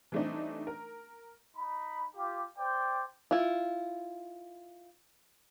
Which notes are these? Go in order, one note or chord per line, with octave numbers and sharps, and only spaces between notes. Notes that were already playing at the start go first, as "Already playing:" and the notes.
E3 G3 A3 C4 D4 D#4
A#4
D#4 B5
F4 G4
C5 D5 G5
E4 F4